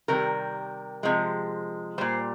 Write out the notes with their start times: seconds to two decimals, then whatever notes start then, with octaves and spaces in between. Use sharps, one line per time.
0.08 C3 D#3 G3 A#4
1.03 C3 F3 G#3
1.98 A#2 G3 C5